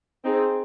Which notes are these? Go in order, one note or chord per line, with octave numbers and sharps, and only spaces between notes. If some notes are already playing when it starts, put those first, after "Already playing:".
C4 D#4 G#4